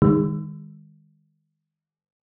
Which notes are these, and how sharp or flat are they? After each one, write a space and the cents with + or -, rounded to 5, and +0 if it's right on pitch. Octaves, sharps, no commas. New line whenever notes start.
D#3 +0 G#3 -40